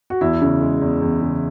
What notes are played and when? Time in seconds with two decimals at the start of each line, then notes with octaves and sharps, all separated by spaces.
0.10 F#4
0.21 E2 E4
0.42 C#3
0.62 G#3
0.82 E2
1.02 E2
1.22 C#3